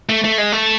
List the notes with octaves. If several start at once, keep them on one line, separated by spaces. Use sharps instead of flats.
A3
A3
G#3
A3